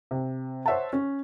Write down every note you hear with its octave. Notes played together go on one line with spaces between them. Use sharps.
C3
C5 C#5 E5 F#5 A5
C#4